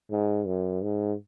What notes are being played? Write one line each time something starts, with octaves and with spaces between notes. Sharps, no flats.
G#2
F#2
G#2